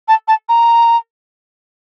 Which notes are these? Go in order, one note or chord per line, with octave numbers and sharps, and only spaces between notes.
A5
A5
A#5